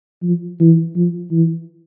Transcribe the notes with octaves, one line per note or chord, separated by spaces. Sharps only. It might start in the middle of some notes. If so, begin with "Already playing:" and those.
F3
E3
F3
E3